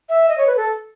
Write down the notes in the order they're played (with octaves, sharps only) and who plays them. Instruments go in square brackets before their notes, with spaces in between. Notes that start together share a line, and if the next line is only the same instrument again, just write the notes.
[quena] E5
D#5
C#5
B4
A4